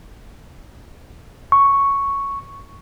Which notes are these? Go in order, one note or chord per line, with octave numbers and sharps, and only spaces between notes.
C#6